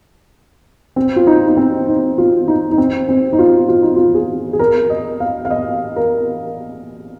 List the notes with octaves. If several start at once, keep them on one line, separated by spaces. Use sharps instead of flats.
C4
F4
D#4
D#4
C4
D#4
F4
D#4
D#4
C4
C4
D#4
F4
F4
D#4
F4
G#4
G#4
A#4
D#5
F5
F5
D#5
A#4